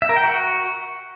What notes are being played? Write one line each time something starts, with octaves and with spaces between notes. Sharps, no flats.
E5
A#4
G5
F#4